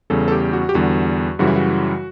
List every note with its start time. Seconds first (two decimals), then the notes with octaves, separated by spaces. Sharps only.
0.10 E2 C#3 G3 A4
0.28 A4
0.32 G4
0.53 F#4
0.69 G4
0.74 E2 D3 G3 F#4
1.39 F#2 C#3 E3 G3 F#4
1.47 E4
1.56 F#4